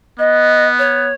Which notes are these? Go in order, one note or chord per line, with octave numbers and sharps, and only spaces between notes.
B3 D#5
C#5